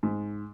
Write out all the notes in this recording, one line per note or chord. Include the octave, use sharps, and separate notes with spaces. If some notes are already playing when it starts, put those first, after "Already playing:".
G#2